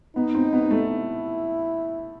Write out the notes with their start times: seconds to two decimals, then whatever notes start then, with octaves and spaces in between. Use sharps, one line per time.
0.16 B3 D#4
0.35 C4
0.53 B3
0.71 A3
0.90 E4